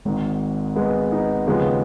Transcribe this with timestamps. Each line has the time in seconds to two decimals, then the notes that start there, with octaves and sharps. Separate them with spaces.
0.05 G#1 G#2 D#3
0.75 G#3 B3
1.11 B3 D#4
1.47 D#2 C#3 F3 G#3 B3